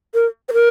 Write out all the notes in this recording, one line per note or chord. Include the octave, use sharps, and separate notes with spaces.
A#4
C5
A#4